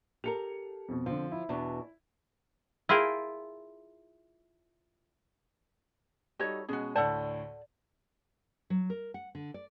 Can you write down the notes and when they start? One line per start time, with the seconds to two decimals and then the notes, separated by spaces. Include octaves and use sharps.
0.24 G4 A4 A#4 C#7 F7
0.88 F2 B2
1.06 D3 F3 C4
1.32 E4
1.49 E2 B2 D4
2.89 E4 F4 G#4 A#4 G5
6.39 G3 D#4 F#4 A4 C#5
6.69 B2 G#3 C#4 F#4 G#4
6.96 D2 A2 A4 D5 F#5 A5
8.70 F#3
8.90 A#4
9.14 F#5
9.35 D3
9.54 D5